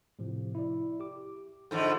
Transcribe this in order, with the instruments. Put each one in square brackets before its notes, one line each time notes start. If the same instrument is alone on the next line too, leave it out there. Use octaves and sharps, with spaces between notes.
[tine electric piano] A2 C3 F3
E4 D5
G4 D6
[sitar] G#2 D3 F3 [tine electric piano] A4 C6 G6